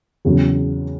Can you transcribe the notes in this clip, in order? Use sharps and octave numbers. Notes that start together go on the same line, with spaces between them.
E2 C#3 F#3